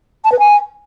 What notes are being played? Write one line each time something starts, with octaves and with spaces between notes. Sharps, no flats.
A5
B4
G#5